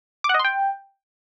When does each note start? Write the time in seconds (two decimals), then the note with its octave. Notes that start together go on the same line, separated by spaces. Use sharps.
0.24 D6
0.29 F#5
0.34 D#5
0.39 C6
0.45 G5